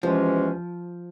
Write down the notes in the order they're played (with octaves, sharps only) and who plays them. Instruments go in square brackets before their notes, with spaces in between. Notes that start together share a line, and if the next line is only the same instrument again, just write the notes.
[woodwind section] E2 C3 E3 G#3 C#4 [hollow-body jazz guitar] F3